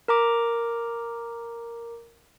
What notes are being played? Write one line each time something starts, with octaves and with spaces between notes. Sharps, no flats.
A#4 A#5 D6